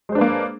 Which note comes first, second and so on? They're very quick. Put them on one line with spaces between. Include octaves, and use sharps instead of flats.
G#3 C5 D4 B4 A#3